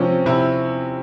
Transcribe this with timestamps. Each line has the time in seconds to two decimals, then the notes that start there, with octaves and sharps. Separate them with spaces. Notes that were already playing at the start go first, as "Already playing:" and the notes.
Already playing: C3 F3 C4 C#4
0.26 C3 E4